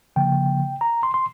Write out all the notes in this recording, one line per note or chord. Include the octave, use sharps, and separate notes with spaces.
C#3 F3 A#3 G5
A#5
C6
C6